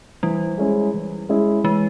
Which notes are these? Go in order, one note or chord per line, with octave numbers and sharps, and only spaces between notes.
E3 G3
G#3 C#4 E4 G#4
E3
G#3 C#4 E4 G#4
E3 G#3